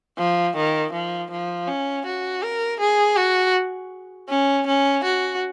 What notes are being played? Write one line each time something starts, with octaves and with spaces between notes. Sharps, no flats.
F3
D#3
F3
F3
C#4
F#4
A#4
G#4
F#4
C#4
C#4
F#4